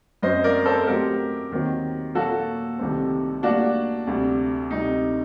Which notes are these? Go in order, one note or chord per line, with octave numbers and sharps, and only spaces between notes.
F#2 F#3 C4 C5 D#5
A#4 D5
A4 C5
A2 F#3 C4 G4 A#4
D#2 D#3 F#3 C4
A#2 F#3 A#3 F#4 A4
C2 C3 D#3 A3 C4
A2 G3 A#3 D4 F#4
D2 C3 G3
D2 C3 G3 D#4